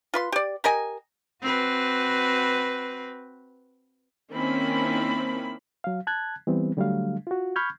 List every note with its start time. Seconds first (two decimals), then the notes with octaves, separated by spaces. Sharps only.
0.14 F4 B4 C6
0.32 G4 D5
0.64 G4 A#4 D#5 G#5
1.42 C4 F#4 B4
4.33 D#3 A#3 C4 C#4 E4 B5
5.84 F#3 F5
6.07 A5 F#6 G#6
6.47 E3 G3 B3 C4
6.77 D3 F#3 G3 A3 D4 F5
7.27 F4 F#4
7.56 B5 C#6 F6 G6 G#6